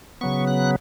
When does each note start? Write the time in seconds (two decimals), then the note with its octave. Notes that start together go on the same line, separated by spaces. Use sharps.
0.21 C#3 F#3 B3 C#6
0.47 F#6